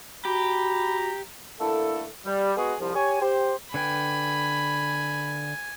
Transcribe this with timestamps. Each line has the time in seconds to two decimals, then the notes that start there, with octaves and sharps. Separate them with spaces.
0.25 F#4 G4 A#5 B5
1.60 D3 A3 A#3 E4 A4
2.26 G3
2.57 G#3 B3 F#4 G#4
2.81 C2 F3
2.95 G4 C#5 G#5
3.21 G4 C5
3.74 D3 B4 G5 G#5 B5